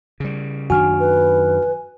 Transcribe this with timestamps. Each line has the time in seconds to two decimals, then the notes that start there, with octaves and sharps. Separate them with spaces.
0.20 C#3 G3
0.70 F#2 D#3 D4 F#4 G#5 F6
1.00 B4